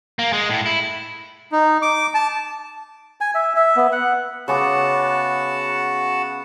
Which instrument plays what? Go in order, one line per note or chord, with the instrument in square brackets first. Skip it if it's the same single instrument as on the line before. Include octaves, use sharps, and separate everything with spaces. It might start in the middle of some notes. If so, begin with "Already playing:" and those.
[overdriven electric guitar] A#3
G#3
A2
E4
[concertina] D#4
D6
A5
[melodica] G#5
E5
E5
B3
F#5
[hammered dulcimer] C#3 B3 D6 [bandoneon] F#4 F#5 A5